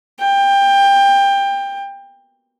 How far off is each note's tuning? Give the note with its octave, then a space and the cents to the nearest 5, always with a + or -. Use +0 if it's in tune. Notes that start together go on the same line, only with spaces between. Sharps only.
G5 +20